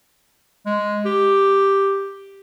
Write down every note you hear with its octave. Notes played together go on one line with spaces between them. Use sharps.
G#3
G4